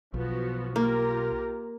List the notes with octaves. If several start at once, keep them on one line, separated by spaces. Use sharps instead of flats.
B1 F3 B3 F#4
A#3 F4 G4 A#4